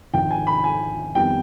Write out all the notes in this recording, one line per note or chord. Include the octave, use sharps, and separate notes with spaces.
G#1 G#2 F3 G5
G#5
B5
G#5
F2 D#3 G3 B3 G5